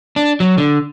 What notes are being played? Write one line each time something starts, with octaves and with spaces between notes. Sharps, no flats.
D4
F#3
D3